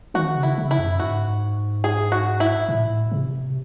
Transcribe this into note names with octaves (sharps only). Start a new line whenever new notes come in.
D#3 F#4
C#3
E4
C#3
E4
F#2
G#2 F#4
G#4
F#4
E4
A2
C3